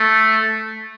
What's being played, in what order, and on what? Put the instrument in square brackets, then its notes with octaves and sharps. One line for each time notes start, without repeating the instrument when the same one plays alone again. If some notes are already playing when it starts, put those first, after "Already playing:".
Already playing: [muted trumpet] A3